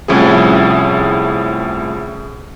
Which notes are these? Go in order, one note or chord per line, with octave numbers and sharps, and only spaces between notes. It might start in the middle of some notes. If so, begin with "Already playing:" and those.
C2 A2 F3 C#4 E4 G#4